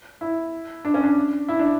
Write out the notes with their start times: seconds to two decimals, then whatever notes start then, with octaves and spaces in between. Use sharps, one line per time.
0.21 E4
0.85 D4
0.94 C#4
1.03 D4
1.48 E4
1.59 D4